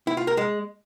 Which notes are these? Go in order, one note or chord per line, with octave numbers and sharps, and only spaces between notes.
E4
F4
A#4
G#3